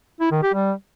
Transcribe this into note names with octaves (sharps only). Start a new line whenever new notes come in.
E4
D#3
G4
G3